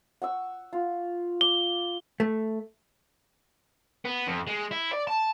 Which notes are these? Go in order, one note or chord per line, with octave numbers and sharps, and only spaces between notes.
F#5 C#6 E6
F4
D6 G7
A3
B3
F2
G#3
E4
D5
A5